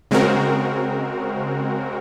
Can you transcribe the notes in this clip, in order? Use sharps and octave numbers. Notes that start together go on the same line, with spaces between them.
C#3 G#3 C4 F#4 A#4